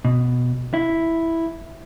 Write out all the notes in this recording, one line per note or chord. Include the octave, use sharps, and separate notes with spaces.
B2
E4